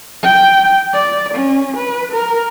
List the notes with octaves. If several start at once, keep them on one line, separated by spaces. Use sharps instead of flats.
G5
D5
C#4
B4
A#4